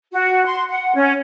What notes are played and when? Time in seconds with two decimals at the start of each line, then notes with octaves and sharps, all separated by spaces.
0.12 F#4
0.45 C6
0.69 F#5
0.94 C#4